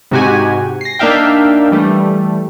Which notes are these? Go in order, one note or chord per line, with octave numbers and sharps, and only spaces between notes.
G#2 C3 F#4 G4 G#5
A#6 C7
A#3 D4 D#4 E5 F5 G5
E3 G3 A3